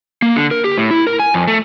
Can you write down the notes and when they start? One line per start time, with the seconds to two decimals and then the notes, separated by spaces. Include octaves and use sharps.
0.22 A#3
0.36 D3
0.51 A#4
0.64 G4
0.78 A2
0.91 E4
1.07 A#4
1.19 G#5
1.34 F2
1.48 A3